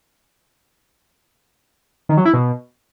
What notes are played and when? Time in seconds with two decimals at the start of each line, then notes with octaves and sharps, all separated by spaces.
2.09 D#3
2.17 F#3
2.25 E4
2.34 B2